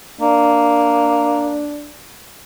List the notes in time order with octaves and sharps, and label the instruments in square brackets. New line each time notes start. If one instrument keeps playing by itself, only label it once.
[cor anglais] A#3 [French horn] D4